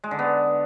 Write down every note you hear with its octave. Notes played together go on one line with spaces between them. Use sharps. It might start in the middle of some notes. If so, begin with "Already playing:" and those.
G#3
D3
B3